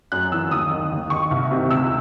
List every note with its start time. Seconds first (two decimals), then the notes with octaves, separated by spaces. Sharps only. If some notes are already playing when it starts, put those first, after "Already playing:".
0.12 F#2 F#6
0.32 E3 E6
0.51 D#2 D#6
0.71 D#3
0.91 D#2
1.10 D#3 C#6
1.31 C2
1.51 C3 D#3
1.70 C#2 E6